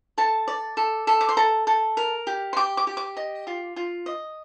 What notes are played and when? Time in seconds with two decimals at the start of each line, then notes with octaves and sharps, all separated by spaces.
0.18 A4 A5
0.48 D5
0.77 A4
1.07 A4
1.21 D6
1.28 C6
1.37 A4 A#5
1.67 A4
1.97 A#4
2.27 G4
2.53 C6
2.56 G4 D6
2.77 D6
2.87 G4
2.97 D6
3.17 D#5
3.47 F4
3.76 F4
4.06 D#5